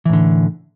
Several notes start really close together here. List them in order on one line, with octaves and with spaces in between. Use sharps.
E3 A2 D3